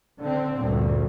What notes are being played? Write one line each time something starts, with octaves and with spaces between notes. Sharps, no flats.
D3 C4
D2 G2 A#2